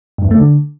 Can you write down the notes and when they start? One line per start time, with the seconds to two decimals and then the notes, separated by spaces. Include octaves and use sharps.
0.18 G2
0.25 E2
0.31 A3
0.37 D3